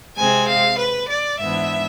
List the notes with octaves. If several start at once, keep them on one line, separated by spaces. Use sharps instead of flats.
C3 G#3 C4 G#5
F5
B4
D5
G#2 E3 B3 D4 E5